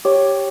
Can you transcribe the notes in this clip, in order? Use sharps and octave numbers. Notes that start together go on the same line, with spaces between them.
G4 C#5